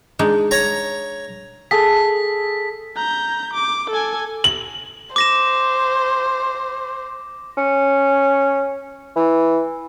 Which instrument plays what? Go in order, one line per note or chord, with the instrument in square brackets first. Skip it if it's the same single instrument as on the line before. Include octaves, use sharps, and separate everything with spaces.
[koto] G#3 D4 D#4
[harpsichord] C#5 A#5
[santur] G#4 A4 [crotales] B6
[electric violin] A#5 G6
D6
A4 G#5
[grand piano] F#7
[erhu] C5 [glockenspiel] D6 A#6 E7
[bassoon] C#4
E3